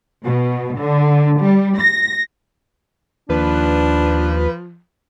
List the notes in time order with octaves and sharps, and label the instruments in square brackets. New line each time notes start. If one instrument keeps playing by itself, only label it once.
[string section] B2
D3
G3
A#6
[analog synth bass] D#2 [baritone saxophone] F3 [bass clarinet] D4 [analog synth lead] B4